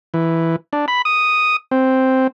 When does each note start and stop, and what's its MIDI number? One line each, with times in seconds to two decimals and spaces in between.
0.14 0.56 52
0.73 0.86 62
0.88 1.02 83
1.05 1.56 87
1.71 2.27 60